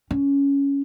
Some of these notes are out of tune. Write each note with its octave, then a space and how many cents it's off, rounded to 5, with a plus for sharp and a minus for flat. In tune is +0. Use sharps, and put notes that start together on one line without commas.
C#4 +10